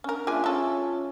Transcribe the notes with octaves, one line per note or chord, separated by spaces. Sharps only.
C#4 D4 A#4
A#3 D4 F4 G#4 E5 G#5
G#3 C#4 A4